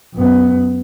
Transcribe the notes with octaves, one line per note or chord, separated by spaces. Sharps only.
F#2 B3